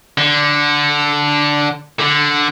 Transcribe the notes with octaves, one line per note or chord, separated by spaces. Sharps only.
D3
D3